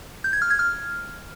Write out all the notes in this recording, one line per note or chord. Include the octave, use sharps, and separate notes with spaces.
G6
G#6
F6
G#6
F6